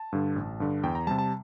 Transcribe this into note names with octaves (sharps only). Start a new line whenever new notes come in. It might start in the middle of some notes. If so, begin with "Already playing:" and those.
Already playing: A5
G2 D3
A1
G2 D3
E2 G5
A#5
C3 G3 A5
A5